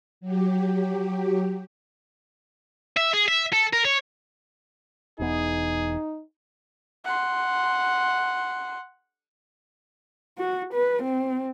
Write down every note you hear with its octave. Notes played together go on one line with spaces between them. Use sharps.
F#3 G4
E5
G#4
E5
A4
A#4
C#5
E1 E2 B3 D#4 G#4
F#5 C6
F#4
B4
C4